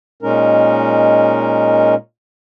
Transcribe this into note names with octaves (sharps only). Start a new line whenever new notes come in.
A#2 G#3 C#4 D#4 A#4